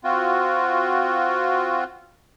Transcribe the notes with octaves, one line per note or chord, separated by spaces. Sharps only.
C4 F4 F#4